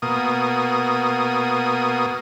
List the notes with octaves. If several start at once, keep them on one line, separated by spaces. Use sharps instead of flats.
B2 A#3 D#6